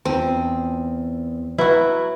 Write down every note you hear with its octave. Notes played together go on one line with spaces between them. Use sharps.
E2 C4 F4 A5
F#3 E4 F#4 B4 G5 A#5